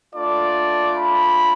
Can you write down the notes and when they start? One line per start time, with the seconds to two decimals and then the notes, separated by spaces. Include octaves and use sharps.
0.15 A3 D4 F4 D5
0.96 B5